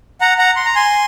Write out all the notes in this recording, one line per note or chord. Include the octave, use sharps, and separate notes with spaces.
F#5 A#5
F#5 A#5
C6
A#5
G#5 C6